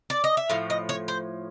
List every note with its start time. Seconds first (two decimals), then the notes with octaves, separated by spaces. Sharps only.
0.10 D5
0.24 D#5
0.37 E5
0.50 A2 F3 F5
0.70 D#5
0.89 C#5
1.08 C5